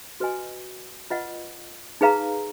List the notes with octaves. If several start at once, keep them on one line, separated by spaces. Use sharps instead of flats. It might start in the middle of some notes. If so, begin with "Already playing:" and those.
F#4 B4 D#5 G#5
F4 B4 D#5 F#5
D#4 G#4 B4 F5 A#5